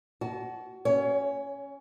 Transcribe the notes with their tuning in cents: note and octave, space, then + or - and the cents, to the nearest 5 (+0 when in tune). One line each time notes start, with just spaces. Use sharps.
F#4 +20 A5 -25
C#4 +0 C#5 +25